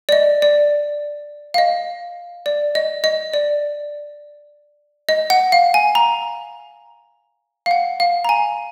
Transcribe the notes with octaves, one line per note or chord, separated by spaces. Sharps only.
D5
D#5
D5
F5
D#5
D5
D#5
D#5
D5
D#5
F#5
F5
G#5
A#5
F5
F#5
F5
A#5
G#5